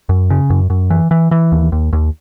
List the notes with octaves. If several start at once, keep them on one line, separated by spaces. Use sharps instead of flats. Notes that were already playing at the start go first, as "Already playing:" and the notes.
F#2
C#3
F#2
F#2
E3
E3
E3
D#2
D#2
D#2